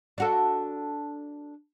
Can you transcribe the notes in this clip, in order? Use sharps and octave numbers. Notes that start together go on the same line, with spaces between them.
D4 F#4 A4